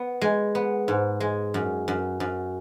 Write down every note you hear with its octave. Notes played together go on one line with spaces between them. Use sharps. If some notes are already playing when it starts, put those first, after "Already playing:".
Already playing: B3
G#3
B3
G#2
G#3
F#2
F#2
F#2